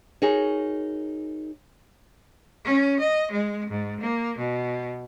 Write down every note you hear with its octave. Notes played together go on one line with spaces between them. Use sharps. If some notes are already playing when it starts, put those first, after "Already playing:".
D#4 F#4 G#4 A#4 C#5
C#4
D#5
G#3
G#2
A#3
B2